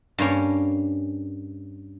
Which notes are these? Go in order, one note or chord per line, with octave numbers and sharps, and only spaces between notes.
G2 A#3 C#4